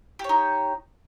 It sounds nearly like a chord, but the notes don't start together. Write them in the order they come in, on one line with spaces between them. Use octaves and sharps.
G4 C#5 D#4